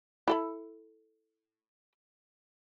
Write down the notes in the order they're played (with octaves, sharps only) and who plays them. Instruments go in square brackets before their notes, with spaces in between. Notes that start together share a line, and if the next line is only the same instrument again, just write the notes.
[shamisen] E4 A4 B5